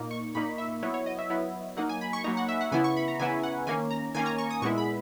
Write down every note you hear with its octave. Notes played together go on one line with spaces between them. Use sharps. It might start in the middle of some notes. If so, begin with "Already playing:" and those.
Already playing: A#2 A#3 D#4
C#6
A#2 A#3 D#4 B5
E5
F#3 B3 E4 C#5
C#5
D#5
E5
F#3 B3 E4
F#3 A#3 D#4 F#5
G#5
B5
C#6
F#3 A#3 D#4 A#5
F#5
E5
F#5
C#3 E3 B3 E4 G#5
C#6
B5
A#5
C#3 E3 B3 E4 G#5
F#5
D#3 A#3 C#4 G#5
A#5
D#3 A#3 C#4 G#5
A#5
C#6
D#6
A#2 G#3 B3 E4 C#6
B5